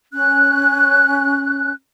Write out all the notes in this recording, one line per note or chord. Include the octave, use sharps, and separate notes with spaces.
C#4 F#6